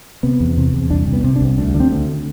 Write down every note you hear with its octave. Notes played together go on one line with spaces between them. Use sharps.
C3 B3
E2
C3
E2
C2 D4
C3
B3
C3
D4
C2
D2 D4
D3
C4
D2